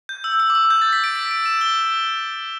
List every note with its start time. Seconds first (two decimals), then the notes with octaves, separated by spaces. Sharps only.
0.09 G6
0.24 E6
0.40 E6
0.50 D6
0.55 E6
0.70 G6
0.82 A6
0.93 B6
1.04 D7
1.15 B6
1.31 D7
1.46 E7
1.61 G7